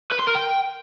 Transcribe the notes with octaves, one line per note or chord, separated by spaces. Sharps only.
B4
C6
A#4
G5